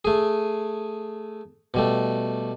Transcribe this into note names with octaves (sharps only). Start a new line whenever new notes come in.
A3 G#4
B2 G3 A3